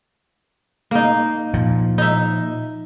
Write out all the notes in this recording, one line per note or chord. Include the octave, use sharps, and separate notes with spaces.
A#3 D#4
A#2 F3
D#4 E5